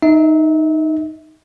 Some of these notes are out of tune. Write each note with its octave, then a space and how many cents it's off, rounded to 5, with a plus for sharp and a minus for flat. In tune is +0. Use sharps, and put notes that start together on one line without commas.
D#4 +0 E5 -30